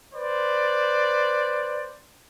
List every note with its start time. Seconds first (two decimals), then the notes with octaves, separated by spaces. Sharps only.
0.14 B4 C5 D5